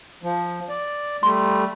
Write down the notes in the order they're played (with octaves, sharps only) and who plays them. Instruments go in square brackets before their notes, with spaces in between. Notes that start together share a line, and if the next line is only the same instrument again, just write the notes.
[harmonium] F3
D5
[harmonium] G3 A3 [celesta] C6